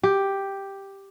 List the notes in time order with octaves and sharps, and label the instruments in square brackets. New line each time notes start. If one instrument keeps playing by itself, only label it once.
[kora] G4